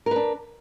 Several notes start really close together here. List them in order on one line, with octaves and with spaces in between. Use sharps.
A#4 B4 D4